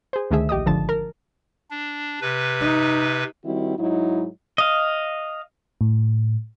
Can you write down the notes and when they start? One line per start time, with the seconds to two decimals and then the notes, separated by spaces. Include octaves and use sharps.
0.13 G#4 C5
0.31 D2 D#3 A3 G#4 E5
0.49 A#1 G4 D#5 D#6
0.66 G#1 D3 F3 A5 A6
0.89 A#4
1.71 D4
2.21 C3 B4
2.61 D#4
3.45 D#3 G3 C4 E4 F#4
3.79 G#2 F#3 D#4 E4
4.58 D#5 F5
5.81 A2